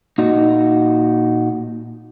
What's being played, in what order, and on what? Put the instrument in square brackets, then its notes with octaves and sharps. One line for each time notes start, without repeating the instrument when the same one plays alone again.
[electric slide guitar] A#2 D#4 F#4